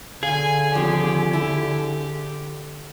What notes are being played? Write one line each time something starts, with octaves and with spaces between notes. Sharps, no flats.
D3 G#4 F5 G#5
D#2 C3 F3 G4
E4